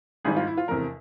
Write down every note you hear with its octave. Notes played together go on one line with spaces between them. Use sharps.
G#1 G#2 D#3 G3 G#4
F4
E4
F4
F1 E2 C3 A#4